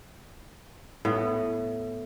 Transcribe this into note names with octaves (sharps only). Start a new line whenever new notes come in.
A2 B3